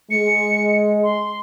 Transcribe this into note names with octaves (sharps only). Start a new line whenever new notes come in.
G#3 C#7
C6